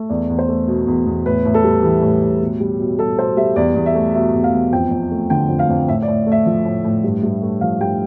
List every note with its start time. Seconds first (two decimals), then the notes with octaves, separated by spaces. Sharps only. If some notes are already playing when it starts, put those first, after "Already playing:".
Already playing: A3
0.10 E2 D5
0.29 E2
0.39 C5
0.48 A3
0.67 B2
0.87 E2
1.06 E2
1.25 A2 B4
1.45 A2
1.54 A4
1.64 G3
1.83 E3 G4
2.02 A2
2.22 A2
2.41 B2
2.60 G3
2.79 B2
2.99 G3 A4
3.18 B2 C5
3.37 G3 E5
3.56 E2 D5
3.75 E2
3.86 E5
3.95 A3
4.14 B2 E5
4.34 E2
4.44 F5
4.53 E2
4.72 F2 G5
4.91 F2
5.11 A3
5.30 D3 G5
5.49 F2
5.59 F5
5.69 F2
5.88 A2 E5
6.02 D5
6.08 A2
6.26 A3
6.32 E5
6.46 F3
6.65 A2
6.84 A2
7.04 G2
7.23 G2
7.42 A3
7.61 F3 F5
7.81 G2 G5